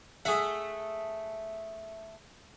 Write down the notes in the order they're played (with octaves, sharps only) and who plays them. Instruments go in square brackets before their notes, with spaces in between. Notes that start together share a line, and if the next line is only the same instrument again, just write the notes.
[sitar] A3 E5 [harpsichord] G#4 F#5